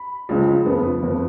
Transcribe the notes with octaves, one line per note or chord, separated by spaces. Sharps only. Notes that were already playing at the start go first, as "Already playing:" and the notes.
Already playing: B5
C#2 C#3 F3
F2 F3 B3
F2 F3 B3